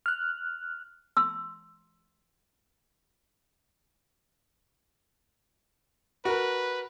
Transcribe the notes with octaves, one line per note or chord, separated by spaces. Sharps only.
F6 F#6
C6 E6
F#4 A#4 B4